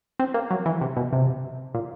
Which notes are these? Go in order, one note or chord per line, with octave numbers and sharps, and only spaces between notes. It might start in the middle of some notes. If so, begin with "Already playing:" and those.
C4
A#3
F#3
E3
C3
B2
C3
A#2